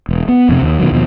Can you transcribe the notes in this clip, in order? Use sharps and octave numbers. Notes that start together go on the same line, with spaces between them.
E1
B3
F2 C3
D#2
B2 D#3 F#3
D#2 B2 F3